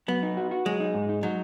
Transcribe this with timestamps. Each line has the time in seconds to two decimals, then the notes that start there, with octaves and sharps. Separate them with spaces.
0.08 F#3 B3
0.23 D#4
0.37 F#4
0.51 F#4
0.66 F#3 G#3
0.80 D#4
0.94 G#2
1.09 D#4
1.23 F#3 D#4